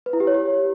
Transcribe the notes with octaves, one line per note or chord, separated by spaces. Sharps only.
B4
E4
G4
C#5
G4